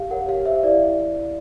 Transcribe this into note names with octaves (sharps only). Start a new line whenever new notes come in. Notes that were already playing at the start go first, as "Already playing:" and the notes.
Already playing: G4 F5
A#4 C#5 F#5
G4 F5
C5 E5
E4 D5